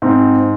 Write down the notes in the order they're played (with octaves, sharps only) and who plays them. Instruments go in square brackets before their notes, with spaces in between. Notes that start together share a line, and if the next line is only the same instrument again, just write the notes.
[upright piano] G#2 [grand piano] C4